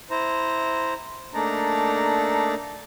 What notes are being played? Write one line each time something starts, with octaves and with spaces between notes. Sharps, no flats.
E4 C5 A#5
A3 A#3 D4 D#4 D5 A#5